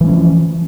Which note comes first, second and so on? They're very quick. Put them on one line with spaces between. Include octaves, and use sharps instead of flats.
E3 G#3 C#4 F3